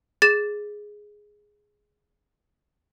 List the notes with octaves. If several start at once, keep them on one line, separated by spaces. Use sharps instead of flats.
G#4 A6 E7